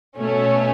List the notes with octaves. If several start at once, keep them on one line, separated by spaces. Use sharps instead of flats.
B2 A3 C#4